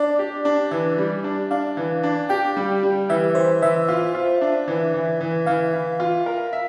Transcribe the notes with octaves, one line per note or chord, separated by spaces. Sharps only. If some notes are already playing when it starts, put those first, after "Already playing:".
Already playing: D4 D5
G4
D4
E3 E5
G3
D4
D4 F5
E3
D4
G4 G5
G3
G3
E3 E5
E3 C5
E3 E5
F4
F4
D4
E3
E3
E3
E3 F5
E3
F4
A#4
E5